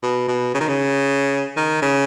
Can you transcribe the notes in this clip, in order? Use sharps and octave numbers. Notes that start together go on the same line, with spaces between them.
B2
B2
C#3
D#3
C#3
D#3
C#3